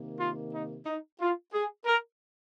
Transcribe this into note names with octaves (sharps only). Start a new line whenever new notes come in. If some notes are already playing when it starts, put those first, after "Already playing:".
Already playing: C3 D#3 A#3
F4
D#4
D#4
F4
G#4
A#4